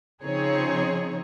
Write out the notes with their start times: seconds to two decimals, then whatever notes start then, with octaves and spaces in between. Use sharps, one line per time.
0.22 C#3 F3 C4 D#4 G#4 C#5